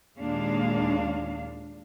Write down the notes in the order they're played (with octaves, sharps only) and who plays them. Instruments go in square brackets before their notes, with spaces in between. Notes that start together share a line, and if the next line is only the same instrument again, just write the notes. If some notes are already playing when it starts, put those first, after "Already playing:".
[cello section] D#2 A#2 G#3 D4 F5